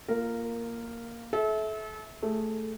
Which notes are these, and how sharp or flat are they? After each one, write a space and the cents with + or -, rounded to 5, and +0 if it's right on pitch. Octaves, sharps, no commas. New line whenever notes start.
A#3 +0 F4 -15 A#4 -10
A4 -35 E5 -20
A3 +0 G#4 +0